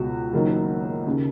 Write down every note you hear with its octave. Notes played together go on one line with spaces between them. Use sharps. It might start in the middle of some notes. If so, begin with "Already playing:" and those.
Already playing: C#2 B2 F#4
F#1 F#2 D#3
D#2 C#3